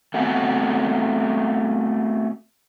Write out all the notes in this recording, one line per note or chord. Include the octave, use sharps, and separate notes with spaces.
A3 B3 C4 F#4 F#5 G#5